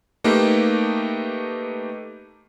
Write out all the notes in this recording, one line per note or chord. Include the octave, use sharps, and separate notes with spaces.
A3 A#3 D#4 G4 B4